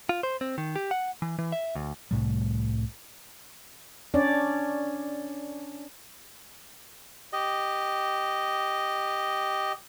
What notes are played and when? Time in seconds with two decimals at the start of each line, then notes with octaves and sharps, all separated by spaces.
0.09 F4
0.23 C5
0.41 C4
0.58 D#3
0.76 G4
0.91 F#5
1.22 E3
1.39 E3
1.52 E5
1.75 D2
2.11 C2 A2 G3
4.14 C#4 D4 C#5 D5
7.33 G4 D#5